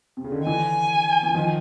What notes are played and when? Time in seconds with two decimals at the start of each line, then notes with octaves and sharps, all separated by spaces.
0.17 C3
0.24 C#3
0.32 D3
0.39 D#3
0.46 D3 E3 G#5
1.23 E3
1.34 D#3 F3